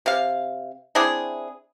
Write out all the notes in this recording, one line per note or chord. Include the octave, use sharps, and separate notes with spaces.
C3 F5
C4 D4 E4 G#4